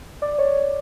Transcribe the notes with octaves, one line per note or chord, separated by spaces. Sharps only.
D5
C#5